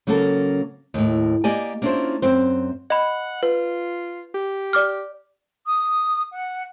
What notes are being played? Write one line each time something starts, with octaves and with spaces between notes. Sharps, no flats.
C#3 F#3 A#3 C#4 A4 A#4
D#2 A2
A#3 G4 D5 D#5 G#5
A#3 C#4 D4 E4 F4 C5
F#2 C4 C5
D#5 F#5 B5
F4 B4
G4
D5 D6 F6
D#6
F#5